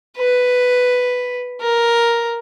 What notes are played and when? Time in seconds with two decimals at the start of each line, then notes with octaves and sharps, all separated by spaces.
0.18 B4
1.61 A#4